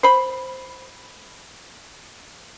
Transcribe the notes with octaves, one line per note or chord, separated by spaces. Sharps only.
C5 B5